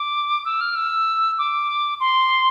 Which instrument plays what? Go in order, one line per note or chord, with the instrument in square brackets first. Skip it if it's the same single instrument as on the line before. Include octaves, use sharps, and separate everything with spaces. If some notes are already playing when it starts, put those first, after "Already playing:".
Already playing: [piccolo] D6
E6
F6
E6
D6
C6